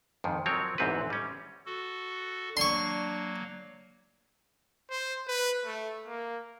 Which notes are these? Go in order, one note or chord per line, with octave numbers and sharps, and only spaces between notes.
F2 G#2 D#3
F3 F#3 C4 A#4 C#5
A1 E2 G#2 C4 F#4 B4
G3 C#4
F#4 A4
F#3 A#3 D4 C6 C#6
C5
B4
A3
A#3